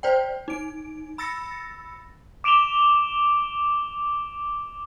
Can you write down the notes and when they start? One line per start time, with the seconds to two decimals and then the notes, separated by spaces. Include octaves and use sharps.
0.03 C5 D5 G5
0.48 D#4 D7
1.18 B5 E6 A6 A#6 C#7
2.44 D6 D7 E7 F7 G7